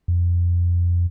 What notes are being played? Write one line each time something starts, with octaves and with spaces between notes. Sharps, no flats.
F2